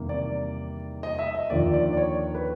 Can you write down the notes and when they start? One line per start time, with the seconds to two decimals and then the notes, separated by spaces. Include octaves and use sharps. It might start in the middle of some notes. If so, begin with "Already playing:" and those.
Already playing: E2 C3 D#3 G3 A#3
0.09 D5
1.03 D#5
1.19 E5
1.35 D#5
1.50 D#2 D3 F3 A#3 D5
1.74 D5
1.93 D5
1.97 C#5
2.35 B4